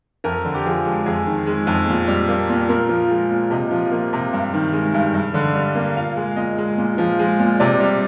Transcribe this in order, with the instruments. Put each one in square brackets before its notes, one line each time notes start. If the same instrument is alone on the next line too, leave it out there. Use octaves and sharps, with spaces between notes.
[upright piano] F2 A#4
D3
G4
F3 G#4
G#3
F2 G#4
D#3
G#3
F2
A#2
G3
A#3
A#2
A#2 A#4
F3
G#3
A#2
C3 D#5
F3
A#3
C3
G2
D#3
G#3
G2
G2
D3
G3
A#3
A#2 F5
G#3
A#2 D#5
G#3
A#2
F3
G#3
A#2
C3 D5
G3